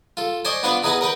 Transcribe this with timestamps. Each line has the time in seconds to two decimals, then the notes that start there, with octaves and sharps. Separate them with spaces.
0.17 F4 A4
0.45 C5 D5 D#5 G#5 C6 C#6
0.63 B3 D4 F4 B4 D5 F#5
0.83 E2 D#4 G#4 B4 D#5 A#5
1.01 A#4 B4 F#5 G5